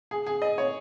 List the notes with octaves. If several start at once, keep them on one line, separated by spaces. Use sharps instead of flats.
G#4
G#4
D#5
C#5